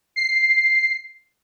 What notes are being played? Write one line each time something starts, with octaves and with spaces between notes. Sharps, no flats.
C7